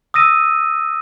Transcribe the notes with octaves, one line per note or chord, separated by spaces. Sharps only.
D#6 E6 A#6 D#7